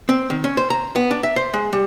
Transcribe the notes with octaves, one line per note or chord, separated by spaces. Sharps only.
C4
D#3
C#4
C5
A#5
B3
D4
E5
C5
G#3
G3